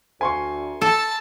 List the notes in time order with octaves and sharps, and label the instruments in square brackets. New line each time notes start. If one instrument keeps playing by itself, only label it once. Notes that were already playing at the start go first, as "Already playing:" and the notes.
[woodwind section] D2 [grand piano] G#5 C6 C#6
[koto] A4 [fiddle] A5 E6